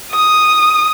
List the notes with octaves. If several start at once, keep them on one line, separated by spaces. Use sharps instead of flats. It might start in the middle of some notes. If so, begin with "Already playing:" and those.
D#6